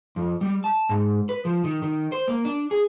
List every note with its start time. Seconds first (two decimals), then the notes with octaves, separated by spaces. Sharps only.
0.16 F2
0.41 G3
0.64 A5
0.89 G#2
1.29 B4
1.45 F3
1.64 D#3
1.82 D#3
2.12 C5
2.28 A#3
2.45 D4
2.71 G#4